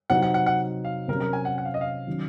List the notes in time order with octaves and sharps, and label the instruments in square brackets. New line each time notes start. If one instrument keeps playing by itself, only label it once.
[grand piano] C3 F#3 C4 D#4 [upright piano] F#5
[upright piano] F#5
F#5
F#5
F5
[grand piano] C3 F#3 C#4 [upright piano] A#4
[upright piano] A#4
G#5
F#5
F#5
F5
D#5
F5
[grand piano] D#3 F#3 C#4